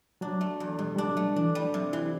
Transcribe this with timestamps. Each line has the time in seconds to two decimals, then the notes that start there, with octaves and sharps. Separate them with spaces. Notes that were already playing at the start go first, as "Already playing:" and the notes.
0.21 F#3 D4
0.41 A3
0.60 E2
0.79 B2 G3
0.96 G3 D4
1.07 F#3
1.17 A3
1.36 E3 D4
1.55 G3
1.64 F#3
1.74 C3
1.93 E3 E4